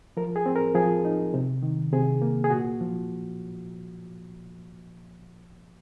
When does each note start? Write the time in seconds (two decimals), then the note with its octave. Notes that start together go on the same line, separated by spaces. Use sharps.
0.17 F3 A#4
0.36 G#4
0.46 C4
0.56 A#4
0.75 F3 G#4
1.05 D#4
1.34 C3
1.63 D#3
1.93 C3 G#4
2.22 A#3
2.44 G#4
2.50 A#2 F#4
2.81 F3